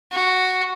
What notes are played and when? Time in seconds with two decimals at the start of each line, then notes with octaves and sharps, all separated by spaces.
0.12 F#4